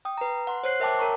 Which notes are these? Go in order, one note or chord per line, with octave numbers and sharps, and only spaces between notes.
G5 D#6
B4 A#5
F#5 C6
C5 C#5 F#6 C7
A#4 E5 G5 A5 D6
A#4 C#5 A#5 C#6